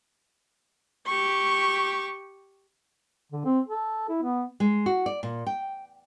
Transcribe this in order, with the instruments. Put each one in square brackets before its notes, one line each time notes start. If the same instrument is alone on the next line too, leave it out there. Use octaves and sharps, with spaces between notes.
[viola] G4 C#6
[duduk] D3
C4
A4
E4
B3
[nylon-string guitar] G#3
F#4
D5
A#2
G5